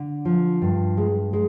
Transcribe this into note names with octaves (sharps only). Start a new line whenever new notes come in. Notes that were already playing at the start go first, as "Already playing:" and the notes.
Already playing: D3
F3
G2
G#3
G#3